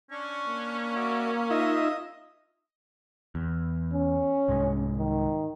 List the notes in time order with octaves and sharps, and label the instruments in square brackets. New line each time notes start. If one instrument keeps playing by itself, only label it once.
[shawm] C#4 [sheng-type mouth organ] D4 C#6
[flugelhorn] A#3
[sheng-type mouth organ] F#4 D5 E5
[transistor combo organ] D#4 F4 E5 [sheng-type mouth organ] D#5 D#6
[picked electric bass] E2
[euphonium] C#4
[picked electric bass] C2 G#2 G#3
[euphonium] D#3